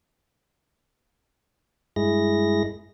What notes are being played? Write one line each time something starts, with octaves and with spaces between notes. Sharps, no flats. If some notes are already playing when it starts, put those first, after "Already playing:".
G2 G#3 E4 G#4 A#6